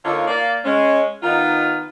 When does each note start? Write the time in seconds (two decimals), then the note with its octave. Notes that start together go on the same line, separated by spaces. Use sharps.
0.05 D3 A#3 D#4 F4 C#5
0.27 A#3 D5
0.64 G#3 C#4
1.23 D#3 B3 D#4 F4